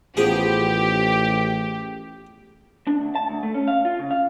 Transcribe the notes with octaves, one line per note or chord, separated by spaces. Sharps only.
A1 F3 B3 F4 G4 G#4
D4
D2
A5
D2
A3
C#4
F5
F4
C#3
F5